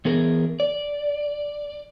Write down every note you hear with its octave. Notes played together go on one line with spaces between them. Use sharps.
E3 B3 G#4 A#4
D5